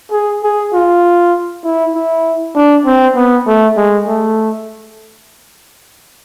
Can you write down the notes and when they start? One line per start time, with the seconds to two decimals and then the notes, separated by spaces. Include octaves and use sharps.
0.11 G#4
0.43 G#4
0.73 F4
1.63 E4
1.94 E4
2.55 D4
2.86 C4
3.15 B3
3.47 A3
3.77 G#3
4.07 A3